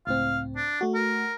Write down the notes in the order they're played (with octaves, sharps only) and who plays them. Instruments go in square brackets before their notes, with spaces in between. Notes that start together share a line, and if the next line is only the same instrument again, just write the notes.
[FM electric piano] C#2 A2 C4 [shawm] F5
[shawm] D4
[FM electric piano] A3 F#4
[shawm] A#4